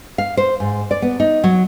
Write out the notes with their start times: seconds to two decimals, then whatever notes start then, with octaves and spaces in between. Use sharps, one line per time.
0.18 F5
0.37 C5
0.60 G#2
0.91 D5
1.02 B3
1.20 D#4
1.44 F#3